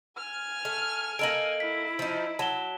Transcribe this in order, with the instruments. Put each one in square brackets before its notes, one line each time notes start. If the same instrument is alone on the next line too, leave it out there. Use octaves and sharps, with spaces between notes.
[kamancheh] G#5 F6
[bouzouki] A3
[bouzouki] A#3 D#4 A4 [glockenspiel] D7 F#7
[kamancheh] E4 [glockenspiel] B6
[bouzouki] F3 D#4
[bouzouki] F#3 [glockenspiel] A5 E7 G7